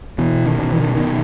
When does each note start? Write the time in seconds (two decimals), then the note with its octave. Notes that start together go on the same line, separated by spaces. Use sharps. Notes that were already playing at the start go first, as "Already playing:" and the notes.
0.18 B2 E3
0.46 D#3
0.59 B2
0.72 E3
0.80 D#3
0.95 B2 D#3